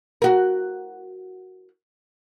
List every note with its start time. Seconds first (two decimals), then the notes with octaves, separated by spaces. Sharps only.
0.22 F#4 A#4